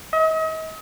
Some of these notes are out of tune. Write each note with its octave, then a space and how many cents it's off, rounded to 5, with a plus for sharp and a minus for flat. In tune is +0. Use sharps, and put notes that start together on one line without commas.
D#5 +40